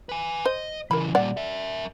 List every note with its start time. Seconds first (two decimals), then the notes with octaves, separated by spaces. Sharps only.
0.09 B4 G#5
0.46 C5 D#5
0.91 C#3 E3 A#4 B5
1.15 A#2 G3 D5 F#5
1.37 A#4 E5